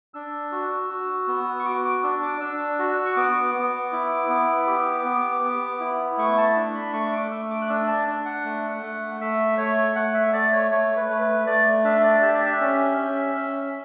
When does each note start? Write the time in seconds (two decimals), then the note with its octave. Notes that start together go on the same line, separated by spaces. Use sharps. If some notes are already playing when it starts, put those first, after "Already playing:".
0.14 D4 E6
0.52 F#4
0.90 F#4
1.28 B3
1.59 C#6
1.65 F#4 D6
1.85 D6
2.03 D4 E6
2.23 D6
2.40 D4 E6
2.79 F#4
3.06 C#6
3.17 B3 D6
3.55 B3
3.93 E4
4.30 B3
4.67 G4
5.05 B3
5.43 B3
5.80 E4
6.18 A3 C#6
6.37 A5
6.56 D4
6.74 B5
6.93 A3 C#6
7.12 D6
7.31 A3 E6
7.51 D6
7.62 F#6
7.70 D4 E6
7.88 A5
8.07 D4
8.25 F#5
8.45 A3
8.82 A3
9.20 A3 E5
9.58 A3 C#5
9.96 A3 F#5
10.14 E5
10.33 A3 D5
10.53 C#5
10.71 A3 C#5
10.96 B4
11.10 A3
11.21 B4
11.47 A3 D5
11.85 D4 E5
12.03 D5
12.22 G4 E5
12.34 D5
12.46 E5
12.60 C#4
12.98 C#4
13.36 C#4